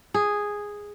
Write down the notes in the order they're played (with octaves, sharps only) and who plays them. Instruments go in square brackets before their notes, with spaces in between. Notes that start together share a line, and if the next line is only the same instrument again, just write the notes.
[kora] G#4